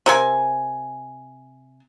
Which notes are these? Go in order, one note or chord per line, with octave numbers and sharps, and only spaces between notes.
C3 A#4 G#5